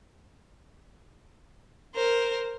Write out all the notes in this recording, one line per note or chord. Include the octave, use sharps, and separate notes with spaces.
A#4 C5